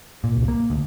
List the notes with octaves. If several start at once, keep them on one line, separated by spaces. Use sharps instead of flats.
A#2
C2
A#3
D2